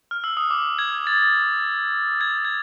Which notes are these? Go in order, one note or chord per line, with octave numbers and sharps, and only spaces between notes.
F6
E6
D#6
D6
G#6
A6
G#6
G#6